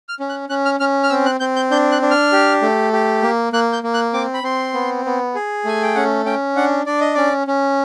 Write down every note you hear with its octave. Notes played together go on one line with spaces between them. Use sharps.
F6
C#4
F#6
C#4 F#6
F6
C#4 F6
F6
C4 E6
F#6
C4 G6
G6
D4 G6
F#6
D4
F6
G4
A3
G4
A#3
A#3 F#6
G6
A#3
F#6
C4 D6
B5
C4 C6
B3
B3
G#4
A3 G#5
G5
C#4 F#5
C#4 G5
D4 F#5
D4 D5
D#5
C#4 D5
C#4